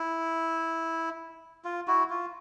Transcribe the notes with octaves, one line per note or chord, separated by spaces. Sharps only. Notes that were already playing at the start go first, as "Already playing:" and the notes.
Already playing: E4
F4
E4 F#4
F4